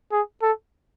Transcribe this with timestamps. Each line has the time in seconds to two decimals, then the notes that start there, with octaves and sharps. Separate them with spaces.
0.12 G#4
0.43 A4